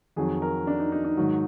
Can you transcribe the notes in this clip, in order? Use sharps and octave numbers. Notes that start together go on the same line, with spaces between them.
F2 D#3 F#3 G#4
A#4
D4
D#4
D#4
D#4
G#2 D#3 F#3